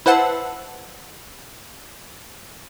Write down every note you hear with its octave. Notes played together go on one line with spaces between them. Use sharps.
E4 B4 C5 F#5 A5 E6